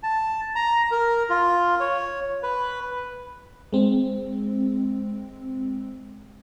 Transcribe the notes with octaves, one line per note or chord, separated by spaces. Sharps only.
A5
A#5
A#4
F4
C#5
B4
G#3 C4